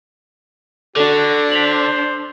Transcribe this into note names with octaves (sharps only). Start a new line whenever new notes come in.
D3 D4 F#4 A4
C5 B6 F7 F#7